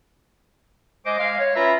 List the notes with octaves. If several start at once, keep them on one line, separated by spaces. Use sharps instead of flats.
G#3 C5 D#5 G#5 D6
G#3 F5
C#5
C#4 F4 B4 E5 A#5 B5